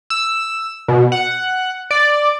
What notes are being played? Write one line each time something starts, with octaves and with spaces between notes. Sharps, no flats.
E6
B2
F#5
D5